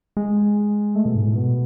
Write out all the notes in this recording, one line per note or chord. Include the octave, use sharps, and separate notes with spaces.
G#3
A3
B2
G#2
A2
B2